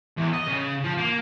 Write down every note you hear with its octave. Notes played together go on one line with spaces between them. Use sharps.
E2
D#5
C#3
F3
A#3